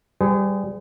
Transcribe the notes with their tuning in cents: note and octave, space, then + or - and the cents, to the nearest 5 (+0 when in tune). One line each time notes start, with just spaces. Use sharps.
G3 +0 G#4 +0 C5 -45